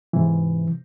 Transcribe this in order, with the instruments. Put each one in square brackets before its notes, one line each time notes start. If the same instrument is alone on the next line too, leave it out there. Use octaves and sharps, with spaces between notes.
[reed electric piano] G#2 C3 E3